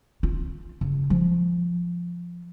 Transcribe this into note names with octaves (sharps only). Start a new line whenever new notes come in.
F4
C#3
F3